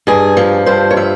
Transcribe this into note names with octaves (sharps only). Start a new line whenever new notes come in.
G2 G#4
F3
G2 C5
C#5
F3 E5